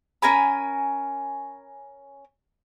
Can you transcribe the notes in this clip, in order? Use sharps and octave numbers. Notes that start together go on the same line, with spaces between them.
C#4 A#4 G#5 B5